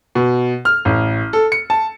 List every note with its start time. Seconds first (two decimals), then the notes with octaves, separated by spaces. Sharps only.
0.15 B2
0.65 F6
0.85 A1
1.33 A4
1.52 C#7
1.70 A5